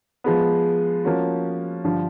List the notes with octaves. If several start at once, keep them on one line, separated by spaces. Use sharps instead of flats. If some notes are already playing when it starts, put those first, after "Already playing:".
F3 G#3 B3
F3 A#3 C#4 F#4
G2 D3 F3